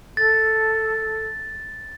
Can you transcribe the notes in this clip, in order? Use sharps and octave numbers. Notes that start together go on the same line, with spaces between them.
A4 A6